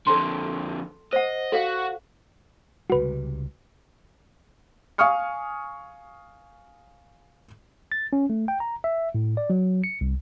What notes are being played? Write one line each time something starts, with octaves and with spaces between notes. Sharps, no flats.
F2 D3 A4 A5 C6
C5 D#5 F#5
F#4 A4 F5
C#2 C3 G3 F#4 B4
F5 G#5 C#6 D#6 F6 C#7
A6
C#4
A3
G5
A#5
E5
A2
D5
F#3
C#7
C2